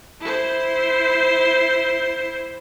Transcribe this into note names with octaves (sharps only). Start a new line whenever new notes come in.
E4 C5